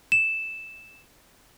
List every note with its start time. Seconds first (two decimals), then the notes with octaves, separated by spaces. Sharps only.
0.12 E7